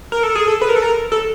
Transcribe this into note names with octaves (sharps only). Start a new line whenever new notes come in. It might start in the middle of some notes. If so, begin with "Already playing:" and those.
A#4
A4
G#4
A4
B4
A#4
A4
A#4
A4